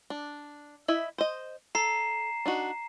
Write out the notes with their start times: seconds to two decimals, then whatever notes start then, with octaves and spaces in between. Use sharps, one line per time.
0.10 D4
0.88 E4 D#5 E5
1.18 C5 D#5
1.75 A4 A#5 C7 E7
2.46 D4 D#4 F#4